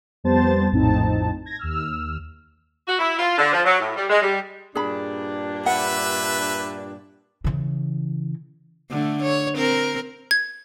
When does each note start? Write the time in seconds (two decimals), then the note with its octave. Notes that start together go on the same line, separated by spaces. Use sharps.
0.24 F2 G3 B3 C5 A5 A6
0.71 A#1 F2 A2 C4 D#4 A5
1.46 G#6 A#6
1.59 D#2 E6 F6
2.87 F#4
2.99 E4
3.19 F4
3.38 D3
3.53 F3
3.65 F#3
3.79 A2
3.96 G3
4.10 G#3
4.22 G3
4.75 G2 A#2 D4 G#4 B5
5.66 B4 E5 F#5
7.44 C#3 E3
8.91 D3 A3
9.23 C#5
9.57 C4 A#4
10.31 G#6